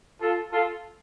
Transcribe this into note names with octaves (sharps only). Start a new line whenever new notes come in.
F4 A4
F4 A4